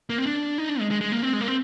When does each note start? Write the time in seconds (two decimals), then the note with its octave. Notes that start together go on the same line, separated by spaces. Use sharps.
0.10 A#3
0.18 C4
0.26 D4
0.58 D#4
0.69 D4
0.80 G#3
0.90 G#3
1.01 G#3
1.12 A#3
1.23 C4
1.33 G#3
1.41 A#3
1.48 C4